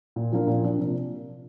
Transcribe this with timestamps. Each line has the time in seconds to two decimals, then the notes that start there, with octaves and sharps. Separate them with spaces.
0.16 A#2
0.32 F3 A#3 D4
0.47 A#2
0.63 F3 A#3 D4
0.78 C3